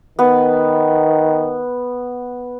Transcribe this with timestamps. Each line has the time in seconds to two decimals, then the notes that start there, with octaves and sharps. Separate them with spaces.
0.19 D#3 B3